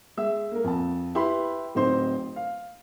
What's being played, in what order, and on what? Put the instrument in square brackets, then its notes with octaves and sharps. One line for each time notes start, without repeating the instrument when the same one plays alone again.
[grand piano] G#3 E5 E6
A#3 A#4
F2 A5
E4 G4 B4 B5 C6
D1 C4 D#4 C5 C6
F5